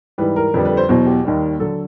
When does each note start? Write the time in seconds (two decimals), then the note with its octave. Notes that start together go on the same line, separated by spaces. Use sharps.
0.18 G#2 E3 G3 B4
0.36 A#4
0.54 F2 D3 G3 B4
0.65 B4
0.77 C5
0.89 E2 B2 F#3 C5
1.06 G4
1.25 D#2 D#3 G3
1.59 D3 F#3 A4